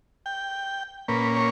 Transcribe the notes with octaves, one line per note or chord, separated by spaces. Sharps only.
G5
A#2 A#3 C#4 B4
C#5